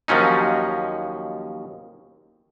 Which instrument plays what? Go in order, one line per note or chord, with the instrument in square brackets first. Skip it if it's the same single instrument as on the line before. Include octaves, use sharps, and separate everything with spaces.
[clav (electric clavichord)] D#2 F3 F#3 C#4 D#4